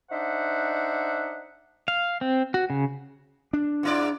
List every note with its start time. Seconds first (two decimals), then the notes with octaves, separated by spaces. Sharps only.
0.11 D4 D#4 C5 E5 F#5
1.88 F5
2.21 C4
2.54 F#4
2.70 C#3
3.53 D4
3.83 G#2 E4 D5